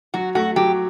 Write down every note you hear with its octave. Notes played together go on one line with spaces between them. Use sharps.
F#3 F#4
A3 F#4
F#3 G4